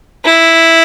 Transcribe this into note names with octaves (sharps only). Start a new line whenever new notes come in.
E4